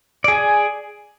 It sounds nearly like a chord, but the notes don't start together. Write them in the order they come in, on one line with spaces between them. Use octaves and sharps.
D5 G#4 G#5